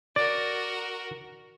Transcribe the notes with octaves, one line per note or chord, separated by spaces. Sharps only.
F#4 A#4 D5